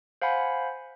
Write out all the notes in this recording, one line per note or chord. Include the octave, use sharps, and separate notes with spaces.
C5 F5 F#5 G#5 B5